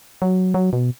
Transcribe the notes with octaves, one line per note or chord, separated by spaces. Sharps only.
F#3
F#3
B2